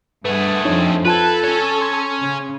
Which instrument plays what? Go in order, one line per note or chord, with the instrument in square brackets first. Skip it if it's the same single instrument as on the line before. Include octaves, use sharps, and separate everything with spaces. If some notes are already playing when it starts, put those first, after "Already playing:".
[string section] G2 F#5 [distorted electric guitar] A3 G#4 [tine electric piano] B4
[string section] F2 [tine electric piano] D4 D#4 C#5
[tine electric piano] F4 A5 G#6 [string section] A4 [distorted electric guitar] B4
[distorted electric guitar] C#4 C#5
[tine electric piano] C6 G#6
[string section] C#3